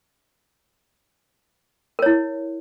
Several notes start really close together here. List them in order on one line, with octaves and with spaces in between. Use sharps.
A#4 C#5 E4